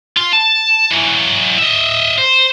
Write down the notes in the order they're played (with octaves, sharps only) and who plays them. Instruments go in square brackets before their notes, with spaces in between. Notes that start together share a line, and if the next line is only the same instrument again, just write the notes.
[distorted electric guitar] F4
A5
E3 F#3
D#5 E5
C5